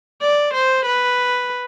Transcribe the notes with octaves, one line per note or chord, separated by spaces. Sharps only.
D5
C5
B4